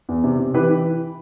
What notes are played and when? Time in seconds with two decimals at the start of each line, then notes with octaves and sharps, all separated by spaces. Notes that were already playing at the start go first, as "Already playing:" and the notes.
0.09 E2
0.24 C3
0.39 C3
0.54 E3 G4 B4
0.70 E3